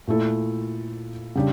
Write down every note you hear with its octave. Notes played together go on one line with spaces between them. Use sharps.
A#2 A3 E4 A4
C#3 G3 D4 G4